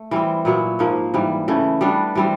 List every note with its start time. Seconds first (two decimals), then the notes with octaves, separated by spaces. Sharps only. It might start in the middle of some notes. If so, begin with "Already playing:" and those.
Already playing: A3
0.11 E3 G3 C4
0.45 A#2 F#3 B3 E4
0.79 G#2 F3 A#3
1.14 G#2 E3 G3
1.48 C#3 E3 A3
1.81 G3 B3 D4
2.15 E3 G3 C4